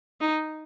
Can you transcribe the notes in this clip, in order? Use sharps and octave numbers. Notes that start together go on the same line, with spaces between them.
D#4